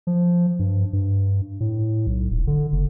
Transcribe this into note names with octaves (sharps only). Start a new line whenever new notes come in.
F3
G2
G2
A2
B1
D#1
D3
F#1